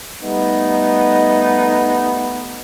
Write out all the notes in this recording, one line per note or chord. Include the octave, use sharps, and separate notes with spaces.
G3 A3 B3 D#4